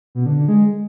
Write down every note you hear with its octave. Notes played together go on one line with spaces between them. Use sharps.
B2
D3
D3
G#3